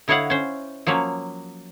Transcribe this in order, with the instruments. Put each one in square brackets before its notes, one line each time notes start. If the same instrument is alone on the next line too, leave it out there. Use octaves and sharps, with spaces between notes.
[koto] D3 E4 C#5 D#5 F5 F#5
C#4 C5
F3 F#3 A#3 C#4